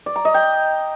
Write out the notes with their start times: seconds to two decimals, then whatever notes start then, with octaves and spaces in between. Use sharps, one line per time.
0.06 D5
0.16 A#5
0.25 D#5
0.34 G5